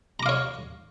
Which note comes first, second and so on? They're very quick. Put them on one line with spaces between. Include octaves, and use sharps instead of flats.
A#5 D6 F5 C#5